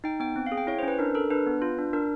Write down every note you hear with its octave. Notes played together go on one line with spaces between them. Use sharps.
D#4 G5
B3 G5
C4
F5
G#4
G5
E4 C#5
C#4 C5
B4
D4 A#4
A4 A#4
D4 B4
B3
F4
D4
D4 A#4